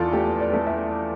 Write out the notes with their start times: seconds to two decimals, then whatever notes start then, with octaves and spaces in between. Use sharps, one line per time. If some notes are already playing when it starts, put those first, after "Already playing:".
Already playing: E2 A3 F4 A4 D5
0.13 A3 G4
0.40 D5
0.53 A3
0.67 E5